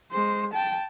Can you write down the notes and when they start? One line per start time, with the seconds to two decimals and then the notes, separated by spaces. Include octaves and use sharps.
0.12 G#3 C5
0.53 G5 A5